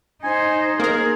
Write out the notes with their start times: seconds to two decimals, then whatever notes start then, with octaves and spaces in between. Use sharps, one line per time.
0.24 D#4 C5 G#5
0.80 A#3 G#4 A#4